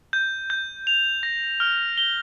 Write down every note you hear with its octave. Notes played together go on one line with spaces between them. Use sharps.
G6
G6
F7
A#6
F6
G7